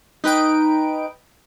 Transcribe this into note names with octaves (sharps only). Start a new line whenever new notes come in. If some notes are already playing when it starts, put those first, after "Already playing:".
D#4 B4 G5 D7